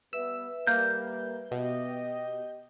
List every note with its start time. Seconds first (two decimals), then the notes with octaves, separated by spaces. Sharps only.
0.13 G3 B3 B4 E5 E6
0.67 G3 A#3 G6
1.51 B2 G4 D#5